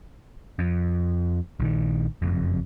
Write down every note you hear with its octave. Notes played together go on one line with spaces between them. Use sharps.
F2
A#1 D3 D#3
F#1 F2